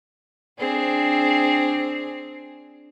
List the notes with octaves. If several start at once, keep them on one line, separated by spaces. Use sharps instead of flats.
C4 D4 G#4